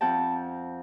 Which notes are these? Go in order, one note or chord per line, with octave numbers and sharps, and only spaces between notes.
F2 F#5 G5 A5